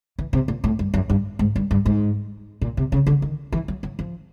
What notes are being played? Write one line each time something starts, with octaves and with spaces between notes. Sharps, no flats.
E3
C3
A#2
A2
G2
F#2
G2
G#2
G2
G2
G#2
A#2
C3
C#3
D3
D#3
E3
F#3
F#3
F3